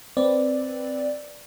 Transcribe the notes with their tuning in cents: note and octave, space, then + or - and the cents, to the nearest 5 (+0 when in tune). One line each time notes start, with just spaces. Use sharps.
C4 +0 B4 +0 D5 +0